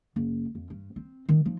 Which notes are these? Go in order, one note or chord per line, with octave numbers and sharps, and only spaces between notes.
F#1
F2
G2
C4
D#3
F3 D#4